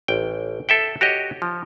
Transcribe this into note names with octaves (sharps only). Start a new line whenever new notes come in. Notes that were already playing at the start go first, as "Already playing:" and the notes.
A1 G5
A4 E5 G5
F#4 G4 C#5 D#5
F3